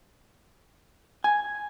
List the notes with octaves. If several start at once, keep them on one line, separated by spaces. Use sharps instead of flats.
G#5